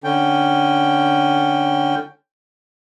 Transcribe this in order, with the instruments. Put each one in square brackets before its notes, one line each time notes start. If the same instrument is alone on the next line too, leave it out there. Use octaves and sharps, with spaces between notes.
[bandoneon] D3 C#4 G5